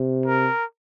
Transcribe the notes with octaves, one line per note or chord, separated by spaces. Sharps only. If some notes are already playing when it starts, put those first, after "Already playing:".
Already playing: C3
A#4